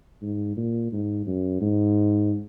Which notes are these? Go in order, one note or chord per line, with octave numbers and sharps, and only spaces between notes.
G#2
A#2
G#2
F#2
G#2